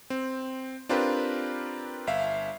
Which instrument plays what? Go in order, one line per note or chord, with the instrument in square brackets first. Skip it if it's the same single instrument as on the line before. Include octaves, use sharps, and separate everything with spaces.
[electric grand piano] C4
C4 D4 F4 G4 A#4 B4
G1 E5 F5